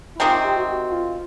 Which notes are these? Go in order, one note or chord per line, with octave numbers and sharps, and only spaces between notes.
E4
C3 D#3 G#3 C4 F4
G4
F#4
F#4
F4